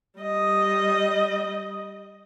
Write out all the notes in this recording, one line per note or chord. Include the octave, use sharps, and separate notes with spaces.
G3 D#5